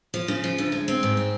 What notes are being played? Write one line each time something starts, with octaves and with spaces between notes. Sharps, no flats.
F3
C#3
F3
D2
G#3
C4
G#2
C4